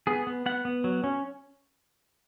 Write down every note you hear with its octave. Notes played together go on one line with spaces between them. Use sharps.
B3 G#4
B3
B3 F#5
B3
F#3
C#4